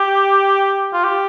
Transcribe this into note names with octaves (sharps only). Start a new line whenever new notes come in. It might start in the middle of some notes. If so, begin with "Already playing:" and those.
Already playing: G4
F4
G4